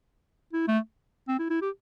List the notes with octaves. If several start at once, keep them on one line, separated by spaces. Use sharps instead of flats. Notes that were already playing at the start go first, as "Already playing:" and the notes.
E4
A3
C4
E4
E4
G4